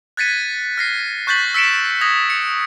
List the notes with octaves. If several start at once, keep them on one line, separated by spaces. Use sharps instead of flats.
F#6 G#6 A6 B6 C#7 D#7
F6 A#6 C7
C#6 F#6 G6 A6 B6 F#7
E6 B6 C#7 D7 E7
D#6 G#6 A#6
C#7